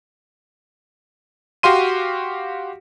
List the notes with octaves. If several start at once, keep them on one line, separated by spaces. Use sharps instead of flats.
F#4 G4 F5 C6 D#7